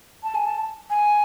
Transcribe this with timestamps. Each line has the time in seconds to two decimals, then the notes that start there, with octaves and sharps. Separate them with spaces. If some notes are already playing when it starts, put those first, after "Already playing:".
0.23 A5
0.35 G#5
0.45 A5
0.90 G#5